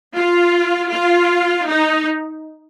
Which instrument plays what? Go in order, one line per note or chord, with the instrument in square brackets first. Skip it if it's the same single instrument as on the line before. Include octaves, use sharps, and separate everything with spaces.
[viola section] F4
F4
D#4